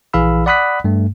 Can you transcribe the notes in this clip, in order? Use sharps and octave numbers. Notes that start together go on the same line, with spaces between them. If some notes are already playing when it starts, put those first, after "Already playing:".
A#1 E3 G#4 F5 B5 E6
D5 F#5 B5 D#6 F#6 B6
G2 A3